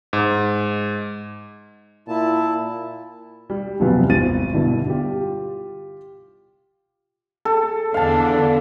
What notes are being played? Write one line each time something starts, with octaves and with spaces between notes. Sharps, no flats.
G#2
A#2 E4 A5
G3
D#1 F#2 C3 F3 B3 F4
G#1 A6 D#7
G2 B2 D3 E4
F4 G4
A4
E2 D3 D4 F5 A5